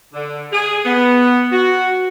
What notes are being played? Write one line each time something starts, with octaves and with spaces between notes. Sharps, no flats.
D3
G#4
B3
F#4